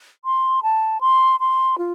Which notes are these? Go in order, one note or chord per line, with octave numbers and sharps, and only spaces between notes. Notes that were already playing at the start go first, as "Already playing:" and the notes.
C6
A5
C6
C6
F4